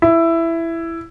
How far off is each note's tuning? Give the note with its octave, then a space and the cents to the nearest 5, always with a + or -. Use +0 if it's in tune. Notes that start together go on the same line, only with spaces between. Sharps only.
E4 +10